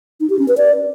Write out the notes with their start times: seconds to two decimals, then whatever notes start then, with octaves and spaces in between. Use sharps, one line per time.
0.20 D#4
0.30 G4
0.39 C#4
0.48 B4
0.57 D5